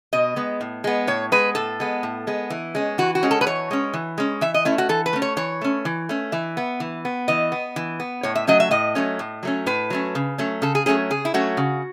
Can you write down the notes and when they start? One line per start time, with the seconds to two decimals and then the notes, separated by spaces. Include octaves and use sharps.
0.13 B2 D#5
0.36 G#3 B3
0.61 A2
0.84 G#3 B3
1.07 A2 C#5
1.32 G#3 B3 B4
1.55 A2 A4
1.80 G#3 B3
2.03 A2
2.27 G#3 B3
2.50 E3
2.75 G#3 C#4
2.98 E3 F#4
3.15 F#4
3.23 G#3 C#4
3.31 A4
3.41 B4
3.46 E3 C#5
3.71 G#3 C#4
3.94 E3
4.18 G#3 C#4
4.41 E3 E5
4.54 D#5
4.65 A3 C#4 E4
4.78 F#4
4.89 E3 A4
5.06 B4
5.13 A3 C#4
5.22 C#5
5.37 E3 C#5
5.61 A3 C#4
5.85 E3
6.09 A3 C#4
6.32 E3 E5
6.57 B3
6.80 E3
7.05 B3
7.28 E3 D#5
7.52 B3
7.76 E3
8.00 B3
8.23 A2 C#5
8.35 E5
8.47 F#3 A3 C#4 D#5
8.60 E5
8.71 A2 D#5
8.95 F#3 A3 C#4
9.19 A2
9.43 F#3 A3 C#4
9.66 A2 B4
9.90 F#3 A3 C#4
10.15 C#3
10.38 F#3 A3 C#4
10.62 C#3 A4
10.75 G#4
10.86 F#3 A3 C#4 G#4
11.10 C#3 G#4
11.25 E4
11.34 F#3 A3 C#4 F#4
11.57 C#3